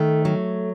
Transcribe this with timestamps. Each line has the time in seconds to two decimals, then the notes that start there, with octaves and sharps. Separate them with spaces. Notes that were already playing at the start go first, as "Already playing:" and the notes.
Already playing: D#3 A3
0.25 F#3